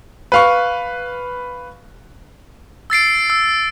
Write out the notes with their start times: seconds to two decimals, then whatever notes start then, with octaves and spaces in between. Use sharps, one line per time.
0.32 B4 F5 C#6
2.90 E6 A6 C7 D7
3.30 E6